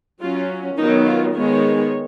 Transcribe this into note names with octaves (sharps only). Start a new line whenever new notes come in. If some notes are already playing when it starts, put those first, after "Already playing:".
F#3 C#4 F4
D#3 F#3 B3 D#4
F4
D#3 G#3 B3 C#5